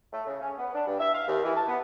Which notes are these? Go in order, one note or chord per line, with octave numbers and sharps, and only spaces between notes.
A3
C#3
C#4
B3
D4
G2
E5
F5
D#2
E3
A5
B3